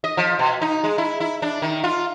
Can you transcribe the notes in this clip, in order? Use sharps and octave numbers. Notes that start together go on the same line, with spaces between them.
D#5
F3
B2
D#4
G#3
E4
E4
D4
D#3
F4